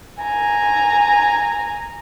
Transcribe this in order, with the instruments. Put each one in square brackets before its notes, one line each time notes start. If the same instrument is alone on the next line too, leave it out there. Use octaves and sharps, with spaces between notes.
[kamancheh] G#5 A#5